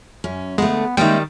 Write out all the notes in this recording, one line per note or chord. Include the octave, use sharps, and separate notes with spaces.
F#2 C#4
D3 G#3 A3 B3
D#3 G3 G#3 A#3 C#4 E5 G5